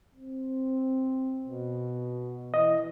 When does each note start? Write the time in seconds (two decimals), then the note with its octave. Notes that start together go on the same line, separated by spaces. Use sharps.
0.15 C4
1.47 B2
2.54 E3 D#5